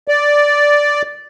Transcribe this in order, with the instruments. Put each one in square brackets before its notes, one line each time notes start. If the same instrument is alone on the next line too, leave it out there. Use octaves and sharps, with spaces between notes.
[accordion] D5